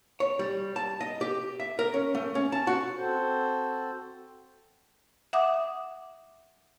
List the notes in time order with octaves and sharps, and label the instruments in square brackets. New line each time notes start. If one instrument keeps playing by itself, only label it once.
[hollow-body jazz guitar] C#5
G3
A5
D#5
G4
E5
A#4
C#4
A3
C#4
A5
F#4
[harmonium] C4 F#4 A4 C5
[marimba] E5 F#5 D6 D#6